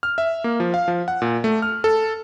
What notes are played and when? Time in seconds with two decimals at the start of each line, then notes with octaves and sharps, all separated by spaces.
0.03 F6
0.18 E5
0.44 A#3
0.60 F3
0.74 F5
0.88 F3
1.08 F#5
1.22 A#2
1.44 A3
1.62 F6
1.84 A4